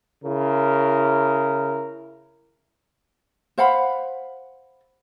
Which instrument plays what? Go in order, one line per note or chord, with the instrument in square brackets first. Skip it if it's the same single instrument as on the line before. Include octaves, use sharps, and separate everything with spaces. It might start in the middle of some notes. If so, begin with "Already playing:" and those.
[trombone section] C#3 E4 A#4
[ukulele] C5 F5 F#5 B5